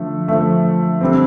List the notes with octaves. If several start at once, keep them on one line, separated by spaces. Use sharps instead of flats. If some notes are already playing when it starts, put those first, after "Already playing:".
Already playing: D3 F3 A3
D3 F3 A3
D3 G3 C4